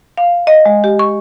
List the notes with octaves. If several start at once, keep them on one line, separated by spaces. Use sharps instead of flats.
F5
D#5
G#3
G4
C#6